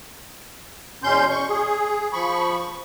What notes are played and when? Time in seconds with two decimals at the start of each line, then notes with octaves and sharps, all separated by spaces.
1.03 E2 B2 C#4 C6 G6
1.30 C#6
1.49 G#4
2.13 F3 B5 C#6